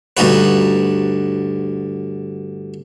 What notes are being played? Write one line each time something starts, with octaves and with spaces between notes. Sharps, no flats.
D2 G2 D#4 F#4 B4